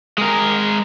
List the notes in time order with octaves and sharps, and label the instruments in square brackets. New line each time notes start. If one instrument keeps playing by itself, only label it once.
[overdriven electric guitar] G#3 A#4